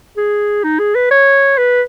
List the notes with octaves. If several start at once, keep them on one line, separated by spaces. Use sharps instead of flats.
G#4
D#4
G#4
B4
C#5
B4